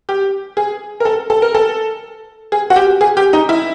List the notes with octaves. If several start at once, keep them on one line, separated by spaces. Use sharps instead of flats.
G4
G#4
A#4
A4
A4
A#4
A4
G#4
F#4
G4
G#4
G4
D#4
E4